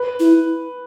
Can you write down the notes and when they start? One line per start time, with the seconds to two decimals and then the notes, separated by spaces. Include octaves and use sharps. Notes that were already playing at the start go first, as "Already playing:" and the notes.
Already playing: B4
0.20 E4